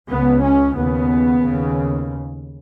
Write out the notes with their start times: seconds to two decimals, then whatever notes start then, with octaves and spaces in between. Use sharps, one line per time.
0.09 C#2 C#3 B3
0.43 C#4
0.76 D#2 C#3 B3
1.43 D#2 C#3